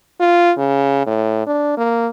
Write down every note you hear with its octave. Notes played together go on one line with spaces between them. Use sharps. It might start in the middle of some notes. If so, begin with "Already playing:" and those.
F4
C#3
A2
D4
A#3